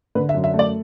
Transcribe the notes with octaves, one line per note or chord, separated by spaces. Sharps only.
D3 B4
E5
F#2
E5
A3
D5